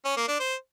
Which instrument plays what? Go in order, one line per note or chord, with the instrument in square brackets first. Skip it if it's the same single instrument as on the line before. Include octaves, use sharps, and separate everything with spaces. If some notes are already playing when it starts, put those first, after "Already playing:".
[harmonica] C#4
A#3
D4
C5